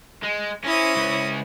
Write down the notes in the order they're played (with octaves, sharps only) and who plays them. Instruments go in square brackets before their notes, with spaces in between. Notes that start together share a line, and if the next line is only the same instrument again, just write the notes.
[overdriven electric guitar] G#3
[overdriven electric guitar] C#4 [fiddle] E4 C5 [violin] D#6 A#6
[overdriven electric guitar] C#2 C#4